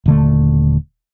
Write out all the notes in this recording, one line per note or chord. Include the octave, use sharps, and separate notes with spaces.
D#1 D3 A3